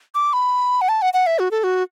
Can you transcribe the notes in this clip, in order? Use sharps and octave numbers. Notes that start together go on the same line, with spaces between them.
D6
B5
F#5
A5
F#5
F#5
E5
F#4
A4
F#4